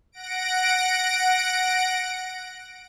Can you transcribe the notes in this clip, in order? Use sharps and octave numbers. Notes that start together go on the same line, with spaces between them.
F#5 A#6 D7